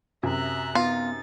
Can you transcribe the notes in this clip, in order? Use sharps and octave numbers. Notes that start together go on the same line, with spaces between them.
F#2 C3 E5 A#5 F#6
B3 D#4 F4 A6